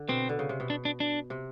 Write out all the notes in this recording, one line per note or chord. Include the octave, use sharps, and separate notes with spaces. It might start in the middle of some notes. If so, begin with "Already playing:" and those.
Already playing: D3
B2 C4
D3
C#3
C3
B2
D4
D4
D4
C3